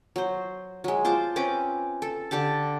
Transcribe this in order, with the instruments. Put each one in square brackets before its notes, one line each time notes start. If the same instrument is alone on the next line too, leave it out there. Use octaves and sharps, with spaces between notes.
[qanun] F#3 C5
F#3 G#3
F4 C5 A5 D6
C4 C#4 B4 D6
A4
D3 D4 G4 A5